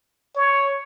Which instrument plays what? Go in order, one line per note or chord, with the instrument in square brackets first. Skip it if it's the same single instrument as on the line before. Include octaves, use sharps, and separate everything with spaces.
[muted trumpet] C#5